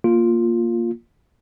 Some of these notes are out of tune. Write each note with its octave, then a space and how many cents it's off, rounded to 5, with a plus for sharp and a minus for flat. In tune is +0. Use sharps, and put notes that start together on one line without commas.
A#3 +0 F4 +0